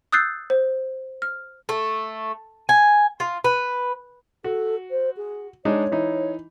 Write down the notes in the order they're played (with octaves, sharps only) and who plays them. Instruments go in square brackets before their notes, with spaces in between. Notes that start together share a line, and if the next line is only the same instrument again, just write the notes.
[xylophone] D#6 E6 F#6 G6 A6 C7
C5
F6
[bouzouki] A3
G#5
F4
B4
[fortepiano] F#4 [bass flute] A4
[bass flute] C5
G#4
[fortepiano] G#3 D4 D#4 [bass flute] C#5
[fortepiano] E3 D#4